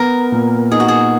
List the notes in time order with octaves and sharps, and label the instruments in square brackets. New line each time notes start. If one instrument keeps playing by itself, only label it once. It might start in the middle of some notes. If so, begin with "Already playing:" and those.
Already playing: [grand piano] B3 [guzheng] A#4
[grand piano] A#2
[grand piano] D#4 [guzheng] G#4
[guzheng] F#4
G#4